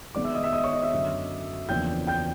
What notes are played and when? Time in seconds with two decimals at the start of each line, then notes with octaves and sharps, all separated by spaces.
0.15 D#3 G#3 B3 D5 D6
0.24 E5 E6
0.35 D#5 D#6
0.43 E5 E6
0.53 D#5 D#6
0.63 C#5 C#6
0.72 D#5 D#6
0.82 E5 E6
0.92 F#2 D3 F#3
1.69 E2 C#3 F3 A#3 D4 G5 G6
2.07 G5 G6